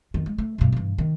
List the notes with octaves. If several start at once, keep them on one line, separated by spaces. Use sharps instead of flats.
F2 D#3
G#3
A3
G2 B2
G2 E3
D#3